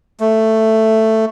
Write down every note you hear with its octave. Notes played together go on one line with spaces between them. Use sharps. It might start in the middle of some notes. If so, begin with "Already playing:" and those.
A3